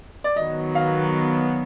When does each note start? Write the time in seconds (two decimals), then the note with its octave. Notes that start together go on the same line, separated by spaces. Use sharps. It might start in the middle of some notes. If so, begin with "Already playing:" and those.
0.24 D5
0.36 D#3 F#3 B3 D#5
0.75 F5